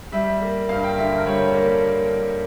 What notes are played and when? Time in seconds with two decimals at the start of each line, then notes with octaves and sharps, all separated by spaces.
0.12 G3 E5
0.41 A#3
0.69 G2 F5
0.84 G5
0.97 D3 E5
1.18 A#4
1.26 G3 C#5
1.54 A#3